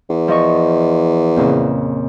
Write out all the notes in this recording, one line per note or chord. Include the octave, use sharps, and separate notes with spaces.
E2
F3 D#5 C#6
F2 A#2 C#3